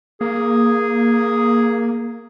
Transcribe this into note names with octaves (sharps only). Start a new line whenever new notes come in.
A#3 G#4